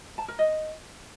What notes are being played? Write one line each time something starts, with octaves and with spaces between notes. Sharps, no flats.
A5
A#4
D#5